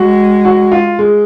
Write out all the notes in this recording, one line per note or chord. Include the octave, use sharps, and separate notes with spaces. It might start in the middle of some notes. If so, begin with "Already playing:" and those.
Already playing: G#3 F#4
F#4
F4
G#3